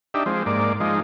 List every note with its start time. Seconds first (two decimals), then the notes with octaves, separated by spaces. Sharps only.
0.14 D4 D#4 G4 E5
0.26 F3 G#3 C4
0.46 G#2 A#3 D5
0.80 F3 G#3 D#4